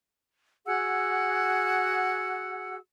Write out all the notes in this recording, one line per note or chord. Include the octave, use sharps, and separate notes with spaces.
F#4 G#4 F#5 E6